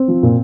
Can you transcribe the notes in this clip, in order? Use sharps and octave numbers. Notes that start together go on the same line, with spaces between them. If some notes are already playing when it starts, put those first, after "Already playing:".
Already playing: C4
F3
A#2